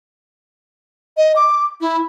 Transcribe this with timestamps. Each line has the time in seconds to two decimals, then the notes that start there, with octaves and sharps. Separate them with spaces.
1.17 D#5
1.36 D6
1.81 E4